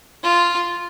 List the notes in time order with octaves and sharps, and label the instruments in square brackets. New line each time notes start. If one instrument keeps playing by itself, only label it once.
[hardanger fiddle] F4